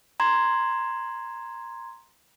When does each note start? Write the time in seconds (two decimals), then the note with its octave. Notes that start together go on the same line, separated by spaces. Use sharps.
0.20 A#5 C6 G#6